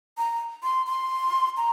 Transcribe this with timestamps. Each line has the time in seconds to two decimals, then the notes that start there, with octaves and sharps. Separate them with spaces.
0.18 A#5
0.63 C6
0.86 C6
1.57 A#5